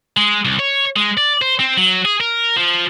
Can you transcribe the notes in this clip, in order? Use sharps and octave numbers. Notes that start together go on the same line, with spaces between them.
G#3
C2
C#5
G#3
D5
C5
C4
F#3
G#4
A#4
F3